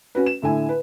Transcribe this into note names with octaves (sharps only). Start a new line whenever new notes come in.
C#4 F#4 B4
E7
A2 D3 E4 G#5
B4